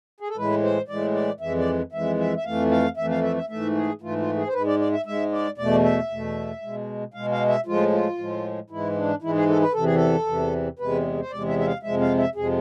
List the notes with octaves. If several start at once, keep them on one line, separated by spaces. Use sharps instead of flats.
G#4
A4
A2 E3 G#3 B4
C5
A2 E3 G#3 D5
D5
F2 E3 G#3 E5
D5
F2 E3 G#3 E5
E5
E5
F2 E3 A3 F5
F5
F2 E3 A3 E5
F5
E5
E5
G#2 E3 A3 E5
G#4
G#2 E3 A3 F4
F4
G#4
C5
G#2 G#3 B4
D5
D5
E5
G#2 G#3 E5
D5
E2 B2 A3 D5
E5
E2 B2 A3
B2 G#3
B2 G#3 F5
F5
E5
A2 F3 G#3 F4
F4
A2 F3 G#3
G#2 E3 G#3 E4
E4
D4
G#2 E3 G#3 E4
G#4
A4
B4
E2 C3 E3 A4
G#4
A4
E2 C3 E3
E2 C3 G#3 B4
C5
E2 C3 G#3 D5
E5
E5
F5
F2 C3 F3 G#3 E5
F5
E5
F2 C3 F3 G#3 G#4